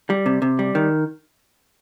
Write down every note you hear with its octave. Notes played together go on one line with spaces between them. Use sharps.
G3
C3
C3
G3
D#3